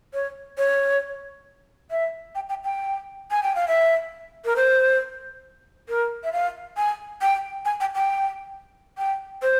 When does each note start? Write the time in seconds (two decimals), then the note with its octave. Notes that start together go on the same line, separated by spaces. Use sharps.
0.14 C#5
0.58 C#5
1.91 E5
2.35 G5
2.49 G5
2.64 G5
3.31 G#5
3.43 G5
3.55 F5
3.68 E5
4.45 A#4
4.56 C5
5.89 A#4
6.24 E5
6.33 F5
6.77 G#5
7.21 G5
7.65 G#5
7.81 G5
7.95 G5
8.98 G5
9.42 C5